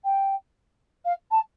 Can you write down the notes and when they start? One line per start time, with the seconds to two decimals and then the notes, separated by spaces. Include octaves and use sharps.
0.04 G5
1.05 F5
1.31 A5